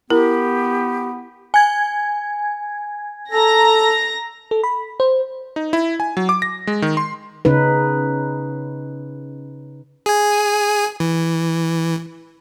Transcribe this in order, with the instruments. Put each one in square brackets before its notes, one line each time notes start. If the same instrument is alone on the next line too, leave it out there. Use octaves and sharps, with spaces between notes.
[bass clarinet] B3 [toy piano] E4 [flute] G4 [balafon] A#4
[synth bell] G#5 G#6
[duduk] A4 [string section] A#5 A#6
[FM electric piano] A4
B5
C5
[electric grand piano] D#4
E4
G#5
F#3
D6
A#6
G#3
D#3
C6
[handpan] C#3 C#4 D#4 B4
[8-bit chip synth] G#4 G#5
E3